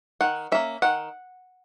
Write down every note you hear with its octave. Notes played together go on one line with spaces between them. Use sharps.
D#3 F#5
A#3 C#4 E5
D#3 F#5